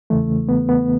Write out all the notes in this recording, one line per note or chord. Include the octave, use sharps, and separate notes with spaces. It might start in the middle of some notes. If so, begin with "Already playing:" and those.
E2 C#3 E3 A3
B3
B3